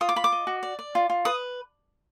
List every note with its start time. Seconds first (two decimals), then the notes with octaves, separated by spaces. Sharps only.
0.01 F4 D#6
0.09 D6
0.16 F4 B5
0.24 D6
0.32 D#5
0.47 F#4
0.63 D5
0.79 D5
0.95 F4
1.10 F4
1.25 B4 D#6